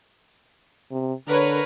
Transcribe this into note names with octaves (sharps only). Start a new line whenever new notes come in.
C3
D3 A#4 B4 C#5